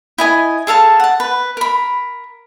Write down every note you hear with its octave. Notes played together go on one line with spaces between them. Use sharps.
E4 D#5 G#5
G#4 A4 F5 A5
F#5 A5
B4
A#4 B5